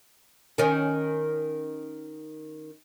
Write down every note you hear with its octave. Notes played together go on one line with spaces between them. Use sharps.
D#3 C#4